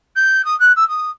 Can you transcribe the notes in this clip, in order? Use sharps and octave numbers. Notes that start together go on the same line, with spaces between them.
G6
D#6
F#6
E6
D#6